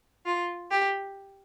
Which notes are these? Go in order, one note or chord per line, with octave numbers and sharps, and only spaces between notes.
F4
G4